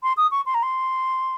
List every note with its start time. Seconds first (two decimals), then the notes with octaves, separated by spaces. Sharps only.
0.03 C6
0.17 D#6
0.31 C#6
0.46 C6
0.54 A#5
0.62 C6